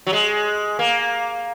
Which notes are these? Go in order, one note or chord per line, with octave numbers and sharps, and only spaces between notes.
F#3
G#3
A#3